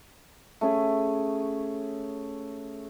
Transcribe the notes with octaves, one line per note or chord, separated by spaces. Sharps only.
A3 C#4 G#4